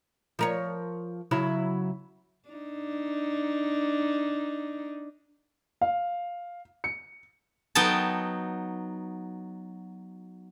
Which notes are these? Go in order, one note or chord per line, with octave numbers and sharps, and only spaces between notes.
F3 A#4 C#5
C#3 F#3 E4
D4 D#4
F5
C#7
F#3 B3 D#4 G5 A5